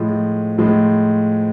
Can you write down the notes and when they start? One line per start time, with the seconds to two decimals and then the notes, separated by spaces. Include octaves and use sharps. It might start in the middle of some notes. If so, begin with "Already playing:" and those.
Already playing: A2 F3 G#3
0.58 A2 F3 G#3